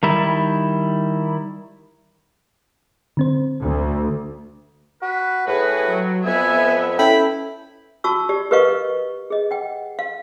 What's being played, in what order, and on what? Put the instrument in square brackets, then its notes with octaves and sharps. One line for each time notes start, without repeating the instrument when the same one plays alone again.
[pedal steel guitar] D#3 G3 E4
[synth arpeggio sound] D3 C4 C5
[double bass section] D2
[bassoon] F#4 [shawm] B4
[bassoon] A2 [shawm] F#4 [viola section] G#4 B4
[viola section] F#3
[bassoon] F2 [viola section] B3 E5 [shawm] G#5
[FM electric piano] C#4 A4 G5 [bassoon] E4 [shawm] B5
[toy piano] F#4 A5 C#6 E6
G4 D5
G4 A#4 B4 D#5 F5 C#6
G#4 D#5
F#5 G5
F5